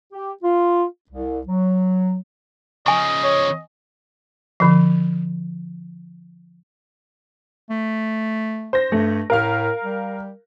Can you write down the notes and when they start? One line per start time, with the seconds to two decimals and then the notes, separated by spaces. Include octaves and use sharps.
0.12 G4
0.43 F4
1.10 C2
1.46 F#3
2.86 C#3 F3 D#5 G#5 C#6
3.24 C#5
4.60 D3 F3
7.70 A3
8.73 C5 A#6
8.92 G2 A3
9.30 A2 A#4 F5 F6
9.84 G3